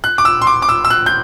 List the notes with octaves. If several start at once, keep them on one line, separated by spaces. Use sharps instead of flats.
F#6
D6
E6
C6
D6
D6
E6
E6
F#6
G6